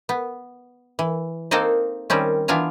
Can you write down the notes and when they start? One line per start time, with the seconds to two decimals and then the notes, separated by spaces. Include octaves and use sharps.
0.09 B3
0.99 E3
1.51 A#3 C4 D#4 A4 C5 D#5
2.10 D#3 G3 C4 C#4
2.48 E3 B3 D4 F4 G#5 A#5